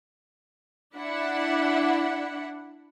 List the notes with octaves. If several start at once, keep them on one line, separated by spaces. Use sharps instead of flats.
D4 E4 F#5